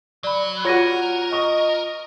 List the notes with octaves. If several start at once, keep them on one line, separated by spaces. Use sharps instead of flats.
F#3 D5 B5
F4 F#4 A#4 C#5 A#6 D#7
D#5 C#6